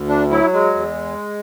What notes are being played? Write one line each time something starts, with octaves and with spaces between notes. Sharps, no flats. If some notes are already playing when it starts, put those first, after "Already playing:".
Already playing: D2
D4
F#3 E4
G#3
E2